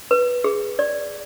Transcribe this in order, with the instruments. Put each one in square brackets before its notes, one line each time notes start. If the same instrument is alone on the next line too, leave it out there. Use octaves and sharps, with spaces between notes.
[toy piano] B4
G#4
D5